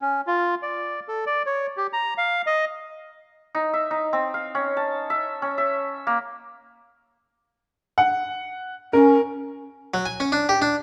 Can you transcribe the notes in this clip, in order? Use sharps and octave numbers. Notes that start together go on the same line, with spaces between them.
C#4
F4
D5
A4
D5
C#5
G4
A#5
F5
D#5
D#4
E5
D#4
C4
F5
C#4
A5
E5
C#4
E5
A#3
F#5
C#4 A#4
F#3
G#5
C#4
D4
G4
D4